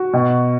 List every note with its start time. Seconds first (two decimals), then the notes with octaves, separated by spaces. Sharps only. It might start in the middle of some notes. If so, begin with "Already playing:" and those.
Already playing: F#4
0.13 B2